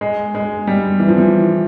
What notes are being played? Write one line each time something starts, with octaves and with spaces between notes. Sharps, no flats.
G#3
G#3
G3
E3
F3
E3